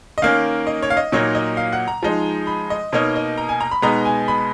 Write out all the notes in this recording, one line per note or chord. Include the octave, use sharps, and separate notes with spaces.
D#5
D#3 A#3 C#4 F5
D#5
C#5
F5
D#5
A#2 F#3 A#3 D#4 C#5
D#5
F5
F#5
A#5
F3 G#3 D#4
B5
D#5
B2 A#3 D#4 C#5
D#5
A#5
G#5
A#5
B5
B2 G#3 B3 D#4 A#5
G#5
B5